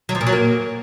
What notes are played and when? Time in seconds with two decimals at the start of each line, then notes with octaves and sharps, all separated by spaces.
0.09 F#3
0.15 F3
0.21 A#2
0.27 F#3
0.32 A#3